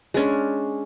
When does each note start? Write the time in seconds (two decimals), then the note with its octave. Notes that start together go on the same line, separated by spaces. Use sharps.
0.14 G#3 C#4 D4